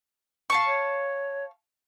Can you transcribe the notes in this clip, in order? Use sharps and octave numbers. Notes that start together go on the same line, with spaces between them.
F5 A5 C#6
C#5